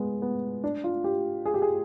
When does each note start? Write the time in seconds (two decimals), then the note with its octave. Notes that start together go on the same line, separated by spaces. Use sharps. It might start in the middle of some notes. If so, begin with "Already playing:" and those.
Already playing: G#3 B3
0.22 B3
0.64 D4
0.84 F4
1.04 G4
1.46 G#4
1.54 G4
1.62 G#4